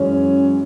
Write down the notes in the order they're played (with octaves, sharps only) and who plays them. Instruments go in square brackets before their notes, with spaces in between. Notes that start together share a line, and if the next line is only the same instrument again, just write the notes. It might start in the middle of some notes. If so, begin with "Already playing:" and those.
Already playing: [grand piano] F#2 E3 G#3 C#4